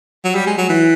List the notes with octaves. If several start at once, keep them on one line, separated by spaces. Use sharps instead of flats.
F#3
G3
G#3
F#3
E3